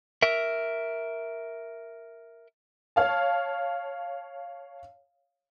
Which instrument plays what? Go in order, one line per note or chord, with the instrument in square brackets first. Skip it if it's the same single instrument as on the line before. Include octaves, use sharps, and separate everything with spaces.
[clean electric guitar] A#4 E5
[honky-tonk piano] C#5 F5 A5